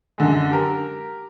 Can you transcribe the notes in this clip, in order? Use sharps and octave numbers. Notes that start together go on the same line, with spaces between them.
F#2 D3 G#3
G4 A#4